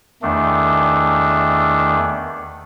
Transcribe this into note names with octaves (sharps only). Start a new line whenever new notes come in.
E2 D#3 A3 D4